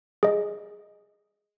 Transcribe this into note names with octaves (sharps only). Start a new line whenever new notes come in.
G#4 D#5